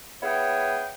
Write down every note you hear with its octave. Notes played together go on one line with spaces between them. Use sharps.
B3 E4 G#4 C#5 G5